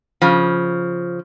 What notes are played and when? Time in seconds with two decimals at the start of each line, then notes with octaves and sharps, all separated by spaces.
0.22 C#3 F3